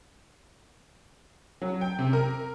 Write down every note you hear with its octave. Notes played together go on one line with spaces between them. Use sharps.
F#3
G5
C3
A#4